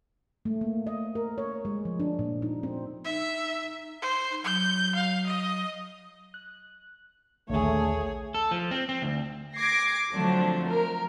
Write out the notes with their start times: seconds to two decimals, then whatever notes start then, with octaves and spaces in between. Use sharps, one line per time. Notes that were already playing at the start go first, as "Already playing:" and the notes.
0.45 A3
0.61 A#3
0.87 D#5
1.15 A#4
1.38 C#5
1.65 G#3
1.85 F3
2.00 D4
2.19 A#2
2.42 D#4
2.63 C4
3.05 D#4 E5
4.02 C5
4.44 F#3 G6
4.95 F5
5.26 D#5
6.34 F#6
7.49 A#1 D#2 D3 A3 G#4 C#5
8.34 A4
8.51 F3
8.71 C4
8.89 C4
9.02 D2
9.54 D6 G#6 A#6 C7
10.13 D3 F3 F#3 A3 C4 D4
10.66 A#4